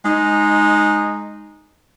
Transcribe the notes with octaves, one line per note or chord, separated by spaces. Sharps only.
G#3 D#4